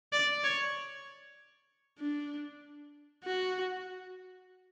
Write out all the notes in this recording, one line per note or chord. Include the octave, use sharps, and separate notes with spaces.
D5
C#5
D4
F#4